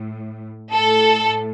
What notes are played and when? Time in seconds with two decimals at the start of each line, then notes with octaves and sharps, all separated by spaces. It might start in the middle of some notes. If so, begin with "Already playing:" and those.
Already playing: A2
0.71 A2 A4